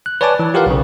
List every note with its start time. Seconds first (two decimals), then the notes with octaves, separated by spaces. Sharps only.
0.06 F#6
0.21 B4 C#5 D5 G#5 A5 D6
0.39 E3
0.54 F4 G4 A#4 B4 F5 F#5
0.66 B1 C#3